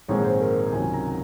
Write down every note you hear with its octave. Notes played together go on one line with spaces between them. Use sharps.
A#1 G#2 D#3 G#3 C4 C#5
C5
A#4
C#2 C3 D#3 F#3 G#5
G#5
A#5